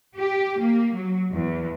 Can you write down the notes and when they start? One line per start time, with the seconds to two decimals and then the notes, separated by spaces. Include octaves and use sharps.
0.17 G4
0.60 A#3
0.95 F#3
1.32 E2